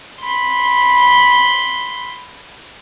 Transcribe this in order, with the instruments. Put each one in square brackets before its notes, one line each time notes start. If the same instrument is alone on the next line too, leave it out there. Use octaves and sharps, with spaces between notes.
[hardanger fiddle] B5 C6